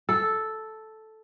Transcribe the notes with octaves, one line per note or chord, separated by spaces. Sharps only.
A4